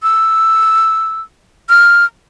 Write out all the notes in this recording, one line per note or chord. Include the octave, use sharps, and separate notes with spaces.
E6
F6